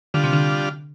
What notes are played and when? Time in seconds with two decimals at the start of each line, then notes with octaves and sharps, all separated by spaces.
0.14 D3 G3 D4 F4
0.24 C3
0.33 D3